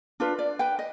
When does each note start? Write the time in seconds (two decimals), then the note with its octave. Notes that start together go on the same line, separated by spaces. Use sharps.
0.20 D4 F4 B4
0.39 D5
0.59 B4 G5
0.79 D#5